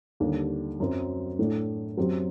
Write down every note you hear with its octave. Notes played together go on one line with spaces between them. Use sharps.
D#2 D3 G3 D4
F#2 F#3 C4
A2 A3 D4
F#2 F#3 C4 G4